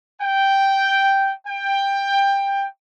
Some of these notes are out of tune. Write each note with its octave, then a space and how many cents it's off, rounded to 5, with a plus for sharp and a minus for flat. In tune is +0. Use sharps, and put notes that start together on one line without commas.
G5 -5
G5 +15